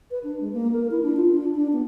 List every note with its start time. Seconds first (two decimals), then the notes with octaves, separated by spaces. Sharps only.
0.11 B4
0.24 D4
0.41 G#3
0.53 A#3
0.72 A#4
0.91 E4
1.02 D4
1.16 F4
1.30 D4
1.55 D4
1.73 B3